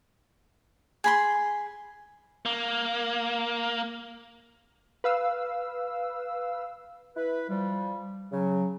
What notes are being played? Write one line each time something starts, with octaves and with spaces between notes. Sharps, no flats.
G#4 B5 C6
A#3
B4 F5 E6
E4 B4
F3 G3
C#3 F#3